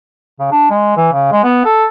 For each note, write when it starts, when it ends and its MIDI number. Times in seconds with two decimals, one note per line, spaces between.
0.40 0.48 49
0.52 0.70 62
0.70 0.96 56
0.97 1.09 52
1.13 1.27 49
1.32 1.39 56
1.44 1.64 59
1.65 1.85 69